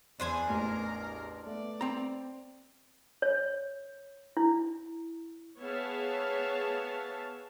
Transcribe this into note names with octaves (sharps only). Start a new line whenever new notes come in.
E2 D4 C5 G#5
A1 E2 A#4
A3 B3 D5
C4 A#5
C#5
E4
B3 G#4 C#5 E5 F5 A5